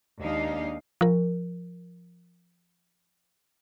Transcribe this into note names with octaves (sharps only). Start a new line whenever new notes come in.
D#2 G#3 A#3 D4 D#4 F5
F3 A#4